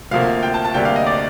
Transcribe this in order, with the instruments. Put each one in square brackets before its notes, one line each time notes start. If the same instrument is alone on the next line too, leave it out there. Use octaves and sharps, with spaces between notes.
[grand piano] D2 C3 F3 A#3 F5
G5
A5
A5
D2 C3 G3 A#3 D4 G5
F5
D#5
D5